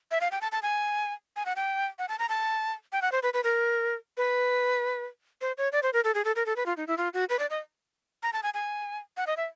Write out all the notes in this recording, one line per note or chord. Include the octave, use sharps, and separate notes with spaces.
E5
F5
G5
A5
A5
G#5
G#5
F#5
G5
F#5
A5
A#5
A5
G5
F#5
C5
B4
B4
A#4
B4
C5
C#5
D5
C5
A#4
A4
G#4
A4
A#4
A4
B4
F4
D#4
E4
F4
F#4
B4
D5
D#5
A#5
A5
G#5
G#5
F#5
D#5
E5